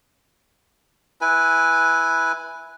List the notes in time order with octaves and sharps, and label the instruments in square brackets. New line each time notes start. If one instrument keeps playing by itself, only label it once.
[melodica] E4 B4 G#5